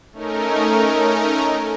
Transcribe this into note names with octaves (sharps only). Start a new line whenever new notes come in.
A3 C#4 D#4 A#4